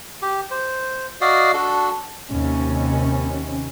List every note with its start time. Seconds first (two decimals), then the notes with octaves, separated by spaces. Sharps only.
0.22 G4
0.51 C5
1.21 F#4 D5 D#5 F5
1.54 D4 F#4 A4
2.30 D#2 C3 C#4